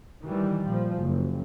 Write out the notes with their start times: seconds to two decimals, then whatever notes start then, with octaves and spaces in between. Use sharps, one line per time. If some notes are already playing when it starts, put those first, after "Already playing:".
0.23 D#3 E3 G3
0.66 A#2 F3
1.00 F#1